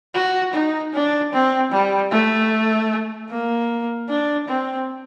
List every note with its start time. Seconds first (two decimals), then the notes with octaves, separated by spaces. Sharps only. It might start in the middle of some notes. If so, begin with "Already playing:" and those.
0.15 F#4
0.54 D#4
0.93 D4
1.33 C4
1.72 G3
2.12 A3
3.30 A#3
4.09 D4
4.48 C4